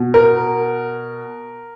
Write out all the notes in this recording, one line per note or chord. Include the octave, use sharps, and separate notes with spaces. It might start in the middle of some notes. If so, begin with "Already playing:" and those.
Already playing: B2
A#4